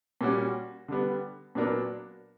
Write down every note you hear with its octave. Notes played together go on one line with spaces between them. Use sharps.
A#2 G3 C#4 F#4
D3 G3 B3
A#2 F#3 B3 D4 A#4